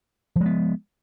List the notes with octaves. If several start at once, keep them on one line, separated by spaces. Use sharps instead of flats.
F3 G#3 B3